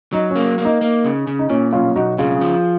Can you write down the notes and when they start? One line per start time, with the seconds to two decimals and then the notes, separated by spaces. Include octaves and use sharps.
0.13 F#3 D#4
0.30 C#4
0.36 A#3
0.58 A#3
0.65 D#4
0.81 A#3
1.05 C#3
1.27 C#3
1.39 D#4
1.49 A#2 C#4
1.73 B1 C#4 F4
1.96 B1 D#4 F#4
2.18 C#3 F4 G#4
2.41 F3